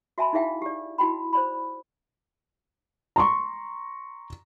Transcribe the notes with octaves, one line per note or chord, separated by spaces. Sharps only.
F#4 E5 G#5 A5 B5
D#4 E4 G#4 E5 F5 G5
G4 D5
E4 F#4 G5 B5
C5 D5 B5
A#5 C6 C#6